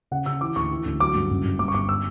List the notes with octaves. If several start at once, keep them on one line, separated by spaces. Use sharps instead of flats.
C#3 F#5
C#3 E6
E3 D6
D2 C#6
E3
D2
F#3 D6
G2
F#1
F#1
G2 D6
C#6
G1 D6
E6